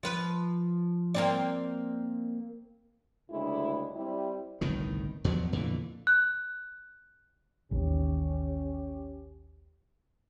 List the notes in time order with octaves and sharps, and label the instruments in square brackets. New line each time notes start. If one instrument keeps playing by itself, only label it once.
[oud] F3 B4
A#3 C4 D5
[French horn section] D2 C#3 G3 G#3 D4 E4
G3 C4 E4
[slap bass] G1 C2 A2 D#3
E2 B2 F3 F#3
F2 A#2 D3 E3
[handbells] F#6
[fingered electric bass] A1 D#2 D#3 [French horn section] C#4 G4